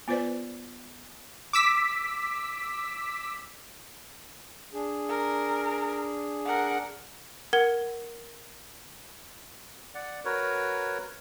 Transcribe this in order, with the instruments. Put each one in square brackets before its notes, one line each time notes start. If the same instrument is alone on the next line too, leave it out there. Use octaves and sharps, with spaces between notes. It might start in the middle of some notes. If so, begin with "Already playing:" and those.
[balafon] B3 F4 B4 C5 D5
[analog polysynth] D6 E6 B6
[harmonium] D4 G#4
[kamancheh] A#4
A#4 F#5
[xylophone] A#4 F#5 G#6 G7
[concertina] D5 F#5
F#4 A#4 B4 C#5